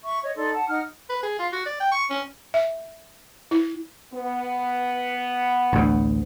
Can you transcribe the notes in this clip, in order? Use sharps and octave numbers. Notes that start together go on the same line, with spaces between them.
E5 C#6
C#5 D#5
D#4 A4 D5 C6
F#5 A5
D#4 F#5 F6
B4
G#4
F4
F#4
D5
G5
C#6
C#4
E5
E4
B3
A1 D2